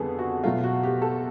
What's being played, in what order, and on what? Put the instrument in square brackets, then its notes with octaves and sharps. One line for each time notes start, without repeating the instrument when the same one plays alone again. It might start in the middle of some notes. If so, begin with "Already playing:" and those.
Already playing: [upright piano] F2 D3 G3 B3 G#4 A4
F#4
B2 F#3 A3 F4
F#4
G4
A4